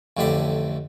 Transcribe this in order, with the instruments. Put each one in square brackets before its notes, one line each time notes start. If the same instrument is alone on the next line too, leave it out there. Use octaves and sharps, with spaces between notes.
[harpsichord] A1 F2 A2 D3 G4 B5